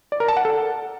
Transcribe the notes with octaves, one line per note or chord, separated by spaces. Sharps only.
D5
A#4
A5
F#5
A4